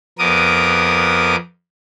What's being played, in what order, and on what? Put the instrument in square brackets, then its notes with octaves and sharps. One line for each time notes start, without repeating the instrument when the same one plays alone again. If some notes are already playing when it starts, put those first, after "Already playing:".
[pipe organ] F2 B3 A#4 D6 D#6